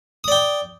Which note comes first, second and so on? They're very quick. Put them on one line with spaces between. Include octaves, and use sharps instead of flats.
D#6 D5 G5